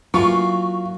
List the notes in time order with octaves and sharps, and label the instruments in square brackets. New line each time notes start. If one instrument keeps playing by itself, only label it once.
[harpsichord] E3 F#3 A#3 [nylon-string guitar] F4 [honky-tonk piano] C#6